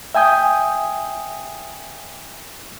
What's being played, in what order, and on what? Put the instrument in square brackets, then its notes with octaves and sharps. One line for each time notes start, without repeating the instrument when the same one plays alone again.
[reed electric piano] E5 G5 G#5 D#6 G6